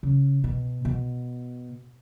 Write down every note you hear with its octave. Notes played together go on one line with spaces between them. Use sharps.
C#3
B2
B2